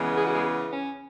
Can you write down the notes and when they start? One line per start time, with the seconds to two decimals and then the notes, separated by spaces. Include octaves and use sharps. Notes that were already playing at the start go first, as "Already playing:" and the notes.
Already playing: E2 C#3 E3 G#3 B3
0.17 G#4
0.26 F#4
0.34 G#3 G#4
0.71 C#4